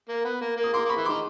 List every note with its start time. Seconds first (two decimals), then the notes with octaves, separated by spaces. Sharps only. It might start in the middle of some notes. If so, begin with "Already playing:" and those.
0.09 A#3
0.25 B3
0.41 A#3
0.57 A#3
0.63 D#6
0.73 A#3 C6 D6
0.85 A#3 B5 C#6
0.97 E3
1.05 D#3 C6 D6